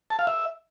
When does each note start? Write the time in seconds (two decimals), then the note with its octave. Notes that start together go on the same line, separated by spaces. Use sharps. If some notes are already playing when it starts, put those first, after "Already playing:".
0.10 A5
0.19 F5
0.27 E5